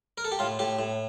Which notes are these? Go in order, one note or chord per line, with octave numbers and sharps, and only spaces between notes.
A#4
A4
G4
A2 F4
A2 G4
A2